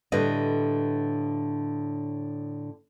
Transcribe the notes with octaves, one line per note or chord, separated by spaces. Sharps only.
A2 D3 G3 B4 D#5